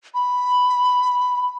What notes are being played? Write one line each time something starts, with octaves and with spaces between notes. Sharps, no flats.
B5